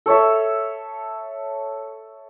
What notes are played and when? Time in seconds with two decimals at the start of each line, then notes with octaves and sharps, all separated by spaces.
0.06 A4 C#5 E5